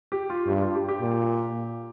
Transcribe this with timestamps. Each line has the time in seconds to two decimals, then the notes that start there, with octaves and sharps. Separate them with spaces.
0.12 G4
0.30 F4
0.47 G2 G4
0.62 F4
0.75 G4
0.89 G4
1.01 A#2